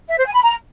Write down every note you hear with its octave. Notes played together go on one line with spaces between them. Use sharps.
E5
C5
G#5
B5
A#5